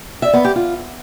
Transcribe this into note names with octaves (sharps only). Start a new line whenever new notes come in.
E5
B3
G4
F4